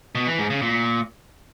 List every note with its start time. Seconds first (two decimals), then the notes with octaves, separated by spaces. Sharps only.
0.15 B2
0.27 E3
0.38 G#2
0.50 C#3
0.62 A#2